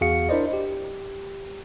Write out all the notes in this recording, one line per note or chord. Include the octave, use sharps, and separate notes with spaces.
E2 F#4 G#4 F5 C#7
D4 E4 A#4 C5 D5 D#5
G4